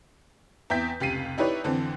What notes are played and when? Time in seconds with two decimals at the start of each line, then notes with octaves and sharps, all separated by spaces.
0.70 E2 E5 G5 G6 B6
1.00 F1 C#2 G4 B6 C7 D#7
1.38 D#4 E4 G4 B4 C#5 D5
1.64 F2 D3 E3 C4